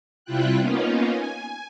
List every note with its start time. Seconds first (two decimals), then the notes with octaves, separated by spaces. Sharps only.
0.25 C3 G3 E4 F4 G5 F#6
0.59 A#3 B3 C#4 D#4 F4
1.11 G#5